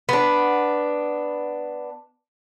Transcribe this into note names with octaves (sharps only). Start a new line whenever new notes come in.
B3 D4